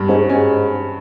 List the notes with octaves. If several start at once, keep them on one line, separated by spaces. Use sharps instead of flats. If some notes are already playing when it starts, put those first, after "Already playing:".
Already playing: G2
G#2 C#4
G#2 C#4